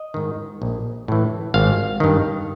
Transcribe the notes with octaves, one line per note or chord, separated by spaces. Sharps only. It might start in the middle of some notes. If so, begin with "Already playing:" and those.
Already playing: D#5
G#2 D#3
A#1
A2 E3
G#1 F5
G2 D#3